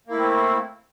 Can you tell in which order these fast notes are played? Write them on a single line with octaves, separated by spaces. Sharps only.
A#3 E4 A3 C4